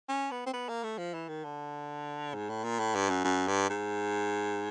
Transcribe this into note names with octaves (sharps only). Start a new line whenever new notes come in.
C#4
B3
C4
B3
A#3
A3
F3
E3
D#3
D3
G#2
A2
A#2
A2
G2
F#2
F#2
G2
G#2